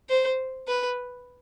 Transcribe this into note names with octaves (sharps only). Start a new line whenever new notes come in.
C5
B4